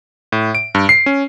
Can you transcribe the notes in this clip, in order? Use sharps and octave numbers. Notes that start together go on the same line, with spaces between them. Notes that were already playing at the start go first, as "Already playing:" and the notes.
A2
D7
G2
C7
C#4